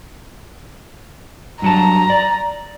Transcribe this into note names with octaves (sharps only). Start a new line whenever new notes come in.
G2 F#3 A5 A#5
D5